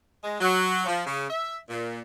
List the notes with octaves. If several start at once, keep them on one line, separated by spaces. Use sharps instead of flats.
G#3
F#3
F3
C#3
E5
A#2